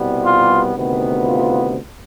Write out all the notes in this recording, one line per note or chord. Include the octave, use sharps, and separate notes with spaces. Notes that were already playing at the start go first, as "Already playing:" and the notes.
Already playing: C2 B2 G3 B3
F4
D2 C3 D#3 B3
F4